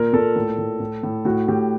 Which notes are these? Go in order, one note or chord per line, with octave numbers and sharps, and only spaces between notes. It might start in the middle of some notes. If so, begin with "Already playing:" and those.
Already playing: A#2 A#4
A#2 A4
A2
A2
A2
A2
A2 F#4
A2 G4